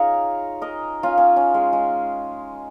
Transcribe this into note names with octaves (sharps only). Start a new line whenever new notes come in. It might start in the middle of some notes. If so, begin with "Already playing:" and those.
Already playing: C#4 D#4 F4 G#4 A#4 C#5 D#5
A#4 D#5
C#4 F4
C#4
C#4
G#3
G#3